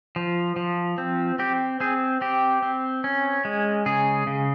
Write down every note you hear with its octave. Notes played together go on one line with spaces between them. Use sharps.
F3
F3
C4
C4 G4
C4 G#4
C4 G4
C4
C#4
G#3
C#3 G#4
C#3